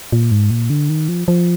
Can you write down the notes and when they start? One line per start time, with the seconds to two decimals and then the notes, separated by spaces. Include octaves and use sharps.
0.12 A#2
0.31 G#2
0.51 A#2
0.70 D3
0.90 D#3
1.09 F3
1.28 F3